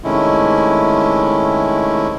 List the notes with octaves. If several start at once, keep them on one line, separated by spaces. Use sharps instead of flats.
C3 D#3 G#3 A3 C#4 E4